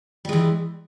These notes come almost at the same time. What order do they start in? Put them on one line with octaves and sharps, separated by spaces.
G3 G#3 E3